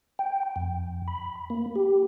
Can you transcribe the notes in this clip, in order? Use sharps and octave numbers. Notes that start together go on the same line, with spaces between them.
G5
F2
B5
A#3
G4